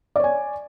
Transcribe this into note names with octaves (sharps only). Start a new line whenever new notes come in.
C#5 D5 G#5